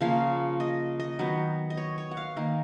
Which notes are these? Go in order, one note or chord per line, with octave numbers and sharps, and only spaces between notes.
C#3 F3 A#3 F5
D#5
D#5
D#3 F#3 B3
D#5
C#5
C#5
F#5
F5
D#3 A#3